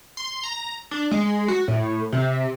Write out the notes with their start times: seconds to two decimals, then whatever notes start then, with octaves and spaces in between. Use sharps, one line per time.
0.17 C6
0.43 A#5
0.91 D4
1.11 G#3
1.48 F#4
1.68 A2
2.12 C3